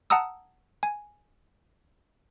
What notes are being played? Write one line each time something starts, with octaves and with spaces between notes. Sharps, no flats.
F#5 A5 A#5 D#6 E6
G#5